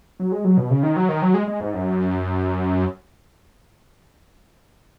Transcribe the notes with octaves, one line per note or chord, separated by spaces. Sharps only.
F#3
G#3
F#3
B2
C#3
D#3
F#3
D#3
F#3
G#3
G#3
G#2
F#2